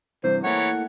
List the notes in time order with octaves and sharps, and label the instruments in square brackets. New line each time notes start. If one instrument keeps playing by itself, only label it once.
[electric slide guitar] G2 C3 E3 [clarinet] C5
[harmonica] E3 A#4 C#5 [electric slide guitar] A3 A#3 E4 [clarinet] F#5